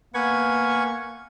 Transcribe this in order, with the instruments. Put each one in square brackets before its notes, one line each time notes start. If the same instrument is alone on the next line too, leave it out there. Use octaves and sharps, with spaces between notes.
[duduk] A#3 [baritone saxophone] B3 [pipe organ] G#5 C#6 G#6